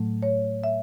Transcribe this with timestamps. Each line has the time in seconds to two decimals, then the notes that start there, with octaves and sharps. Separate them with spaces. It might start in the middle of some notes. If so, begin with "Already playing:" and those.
Already playing: A2 F#3 A3
0.22 C#5
0.64 E5